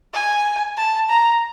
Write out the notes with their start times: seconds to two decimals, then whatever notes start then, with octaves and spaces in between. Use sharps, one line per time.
0.14 G#5
0.77 A5
1.10 A#5